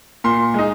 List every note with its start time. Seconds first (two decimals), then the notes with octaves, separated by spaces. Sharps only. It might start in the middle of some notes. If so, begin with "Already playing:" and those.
0.24 A#2 C6
0.54 G#3 D#4